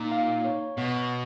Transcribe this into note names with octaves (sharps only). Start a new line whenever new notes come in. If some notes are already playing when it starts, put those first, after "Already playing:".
Already playing: A#2 D#4
F5
C#5
B2 B3